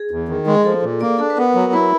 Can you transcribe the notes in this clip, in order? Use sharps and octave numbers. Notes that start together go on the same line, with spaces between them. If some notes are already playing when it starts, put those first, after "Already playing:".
Already playing: G#4
E2
D#3
G#3
G#4
F3 A4
A#2
A#3 D5
D4 A4
B4
B3 A#4
F#3
A#4
E4 B4